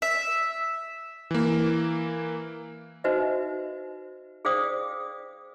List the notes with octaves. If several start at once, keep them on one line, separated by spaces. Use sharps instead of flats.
E5
E3 A#3
D#4 F#4 B4 C5 D#5 E5
G#4 C5 D5 F5 G5 D#6